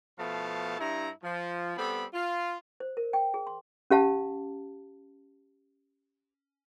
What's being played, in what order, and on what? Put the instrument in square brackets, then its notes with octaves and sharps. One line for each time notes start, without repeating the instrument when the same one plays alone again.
[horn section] B2 F3 A3 B3 F5 A5
G2 E4 A#5
F3
G3 B3 C4 A4 B5
F4
[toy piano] C5
A#4
G5
G#4
C6
C#4 G4 F5 A5